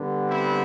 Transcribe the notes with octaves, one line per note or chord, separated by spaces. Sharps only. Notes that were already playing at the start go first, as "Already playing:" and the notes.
Already playing: D3 G3 B3
C4 E4